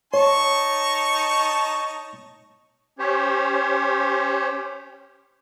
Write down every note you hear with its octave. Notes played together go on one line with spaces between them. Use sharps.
D#4 C#5 A5 C#6
C#4 G4 C5 C#5